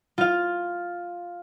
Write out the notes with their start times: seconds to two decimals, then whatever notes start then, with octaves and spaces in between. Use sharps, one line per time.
0.18 F4 F5